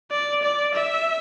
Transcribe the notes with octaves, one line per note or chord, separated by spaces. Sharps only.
D5
D5
E5